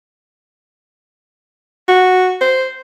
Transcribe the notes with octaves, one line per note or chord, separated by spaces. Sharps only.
F#4
C5